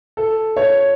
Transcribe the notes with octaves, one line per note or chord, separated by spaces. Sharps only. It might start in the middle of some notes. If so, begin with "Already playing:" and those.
A4
C#5